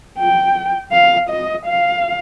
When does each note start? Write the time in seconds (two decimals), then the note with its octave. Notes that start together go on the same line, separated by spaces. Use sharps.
0.19 G5
0.92 F5
1.30 D#5
1.66 F5